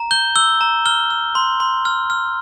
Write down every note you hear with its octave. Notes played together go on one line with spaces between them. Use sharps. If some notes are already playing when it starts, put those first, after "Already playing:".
Already playing: A#5
G6 G7
E6 G7
A#5
F6 G7
F6
C6
C6
F6
F6